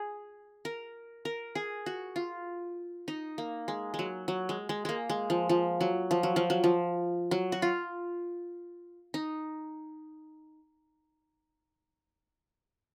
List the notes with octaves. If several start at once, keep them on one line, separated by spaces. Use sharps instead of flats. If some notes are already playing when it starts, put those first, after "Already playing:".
Already playing: G#4
A#4
A#4
G#4
F#4
F4
D#4
A#3
G#3
G#3
F#3
F#3
G#3
G#3
G#3 A#3
G#3
F3
F3
F#3
F3
F#3
F3
F#3
F3
F#3
F#4
F4
D#4